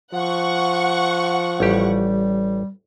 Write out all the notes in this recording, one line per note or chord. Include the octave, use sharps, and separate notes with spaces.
F3 F#5 C#6
A1 G3 G4